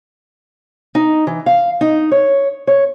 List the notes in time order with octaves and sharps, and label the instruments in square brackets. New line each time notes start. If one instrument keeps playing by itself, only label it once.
[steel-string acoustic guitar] D#4
E3
F5
D#4
C#5
C#5